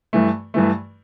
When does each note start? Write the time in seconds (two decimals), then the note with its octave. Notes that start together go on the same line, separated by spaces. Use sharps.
0.13 G2 E3 A3
0.54 G2 E3 A3